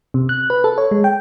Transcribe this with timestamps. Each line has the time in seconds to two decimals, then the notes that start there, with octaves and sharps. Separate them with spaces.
0.14 C3
0.29 F#6
0.50 B4
0.64 A4
0.78 C#5
0.91 G#3
1.04 G5